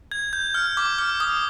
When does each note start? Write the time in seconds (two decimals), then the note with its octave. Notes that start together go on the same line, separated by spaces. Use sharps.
0.11 G#6
0.33 G6
0.55 F6
0.77 D6
0.98 F6
1.20 D#6